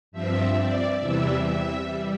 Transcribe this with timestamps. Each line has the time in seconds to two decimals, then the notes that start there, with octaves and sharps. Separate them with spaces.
0.12 G2 F3 C4 E5
0.55 D5
0.99 E2 C3 E3 G3 E5
1.43 E5
1.87 G3